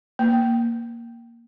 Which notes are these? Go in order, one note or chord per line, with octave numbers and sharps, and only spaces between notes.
A#3